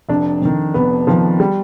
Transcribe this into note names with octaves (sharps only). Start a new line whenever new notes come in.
F1 D4
F2 D#3
F1 B3
F2 D#3 F3
G3